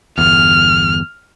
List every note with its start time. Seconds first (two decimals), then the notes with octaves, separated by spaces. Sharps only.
0.18 G1 E2 F6